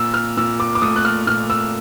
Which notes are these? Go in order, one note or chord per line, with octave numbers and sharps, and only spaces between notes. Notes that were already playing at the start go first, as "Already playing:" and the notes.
Already playing: A#2 E6
F6
A#2 E6
D6
D6
A3 D#6
F#6
F6
A#2 F6
E6